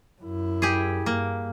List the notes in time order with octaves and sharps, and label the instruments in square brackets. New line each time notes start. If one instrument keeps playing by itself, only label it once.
[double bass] F#2 E4
[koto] G4 G#4
[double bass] G2 [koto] A#3